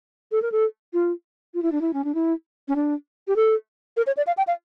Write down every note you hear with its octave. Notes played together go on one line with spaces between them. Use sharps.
A4
A#4
A4
F4
F4
E4
D4
E4
C#4
D4
E4
C#4
D4
G4
A4
A#4
C#5
D5
F5
G5
F5